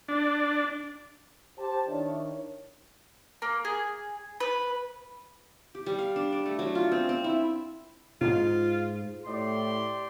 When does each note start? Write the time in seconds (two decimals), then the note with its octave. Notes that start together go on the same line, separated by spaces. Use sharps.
0.08 D4
1.59 G4 C5 A5
1.88 D#3 D4 E4 C#5
3.42 A#3
3.65 G#4
4.40 B4
5.75 G4
5.86 G3
5.99 F5
6.16 D4
6.33 D5
6.46 A3
6.59 F#3
6.75 F4
6.92 C4
7.09 C4
7.24 E4
8.21 G#2 F4
9.26 A2 G4 C5 D5 C6